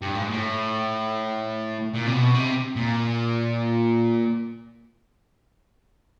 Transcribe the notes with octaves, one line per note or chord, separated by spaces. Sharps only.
G2
G#2
A2
A#2
C3
B2
C3
A#2